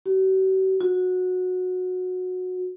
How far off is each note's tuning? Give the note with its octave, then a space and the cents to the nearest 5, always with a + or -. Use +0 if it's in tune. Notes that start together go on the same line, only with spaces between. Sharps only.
F#4 +45
F#4 -15